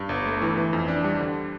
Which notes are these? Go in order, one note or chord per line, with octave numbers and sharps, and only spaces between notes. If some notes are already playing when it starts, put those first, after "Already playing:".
Already playing: G2
G1
A3
E3
E3
F2
D4
G3
D3